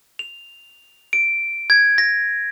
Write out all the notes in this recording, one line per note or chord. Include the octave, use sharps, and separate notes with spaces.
F7
D7
G#6
A#6